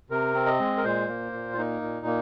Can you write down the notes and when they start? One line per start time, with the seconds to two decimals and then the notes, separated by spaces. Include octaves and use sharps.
0.10 C3 A#4
0.34 C4
0.47 D#5
0.60 G#3
0.77 A#4
0.84 A#2 C5
1.08 A#3
1.33 A#2
1.52 F4
1.58 A#3 D#4
1.82 A#2
2.06 A#3